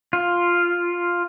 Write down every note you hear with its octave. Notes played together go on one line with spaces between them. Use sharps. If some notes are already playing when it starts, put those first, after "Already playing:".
F4